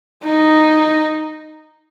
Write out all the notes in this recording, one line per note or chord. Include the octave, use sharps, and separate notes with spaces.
D#4